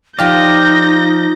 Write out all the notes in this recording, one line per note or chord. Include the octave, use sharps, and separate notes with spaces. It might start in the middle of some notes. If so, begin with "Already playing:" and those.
F3 D#4 F4 G4 D5 D#5 G6 A#6